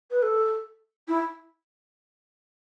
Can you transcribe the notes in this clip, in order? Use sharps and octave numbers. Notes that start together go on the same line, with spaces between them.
B4
A4
E4